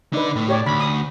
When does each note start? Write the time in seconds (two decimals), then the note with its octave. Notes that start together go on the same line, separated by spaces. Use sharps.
0.13 D3 D#4 B4 D5
0.36 A2
0.48 G4 C#5 D5
0.66 D2 B5
0.80 D#6